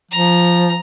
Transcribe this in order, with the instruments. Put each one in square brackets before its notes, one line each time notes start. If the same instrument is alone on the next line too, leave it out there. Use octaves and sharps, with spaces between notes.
[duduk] F3 [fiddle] A#5